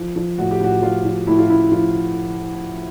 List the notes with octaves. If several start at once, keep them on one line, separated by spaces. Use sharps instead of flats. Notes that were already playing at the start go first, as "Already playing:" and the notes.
Already playing: F3
F3
A2 F#4
G4
A2 F#4
F3 F4
F3
A2 E4
F4
A2 E4
F3 F4